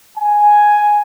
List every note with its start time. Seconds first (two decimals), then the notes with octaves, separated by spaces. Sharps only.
0.18 G#5